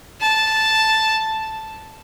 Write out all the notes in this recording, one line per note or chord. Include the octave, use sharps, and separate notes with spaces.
A5